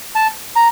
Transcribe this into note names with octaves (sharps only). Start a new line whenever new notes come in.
A5
A#5